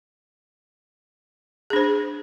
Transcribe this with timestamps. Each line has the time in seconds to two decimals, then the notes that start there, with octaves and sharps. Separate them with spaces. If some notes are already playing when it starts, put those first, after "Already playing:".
1.70 G#4
1.73 D4
1.76 C5